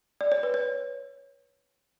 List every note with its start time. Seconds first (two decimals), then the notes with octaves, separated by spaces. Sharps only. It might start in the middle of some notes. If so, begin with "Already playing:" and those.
0.21 D5
0.32 C#5
0.43 B4
0.54 C#5